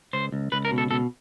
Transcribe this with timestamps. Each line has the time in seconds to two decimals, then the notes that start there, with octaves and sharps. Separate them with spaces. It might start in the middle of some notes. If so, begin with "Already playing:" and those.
0.13 C#2 C5
0.32 C#2
0.52 C#2 B4
0.65 A#4
0.71 B2
0.78 A4
0.91 B2 A4